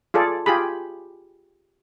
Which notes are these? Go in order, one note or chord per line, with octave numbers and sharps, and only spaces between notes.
F4 G#4 A4 D5
F4 G4 G#4 B5